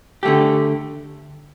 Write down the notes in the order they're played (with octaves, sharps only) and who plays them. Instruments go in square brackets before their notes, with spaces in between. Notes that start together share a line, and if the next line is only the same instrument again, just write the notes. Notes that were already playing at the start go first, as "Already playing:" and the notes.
[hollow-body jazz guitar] D3 A3 G4